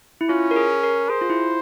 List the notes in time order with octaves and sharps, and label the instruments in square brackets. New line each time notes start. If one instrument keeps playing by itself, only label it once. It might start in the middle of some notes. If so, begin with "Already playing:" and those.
[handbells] E4
[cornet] C#4 [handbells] F4
[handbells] A#4
G#4
A#4
[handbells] G#4 [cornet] C5
[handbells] F4
E4